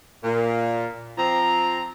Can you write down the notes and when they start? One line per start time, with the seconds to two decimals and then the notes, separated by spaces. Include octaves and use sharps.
0.24 A#2
1.18 F3 C4 A#5